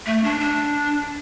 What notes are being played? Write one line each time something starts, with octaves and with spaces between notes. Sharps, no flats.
A3
D4
D4